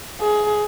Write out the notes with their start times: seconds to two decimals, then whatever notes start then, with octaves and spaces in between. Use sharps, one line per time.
0.21 G#4